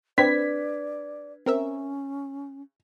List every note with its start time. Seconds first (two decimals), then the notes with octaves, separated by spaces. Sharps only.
0.18 C4 D4 B4 D5 G#6 B6
1.46 C4 C#4 A#4 E5